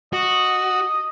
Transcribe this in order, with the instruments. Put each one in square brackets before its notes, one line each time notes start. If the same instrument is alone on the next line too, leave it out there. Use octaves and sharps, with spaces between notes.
[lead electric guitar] F#4 [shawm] D#5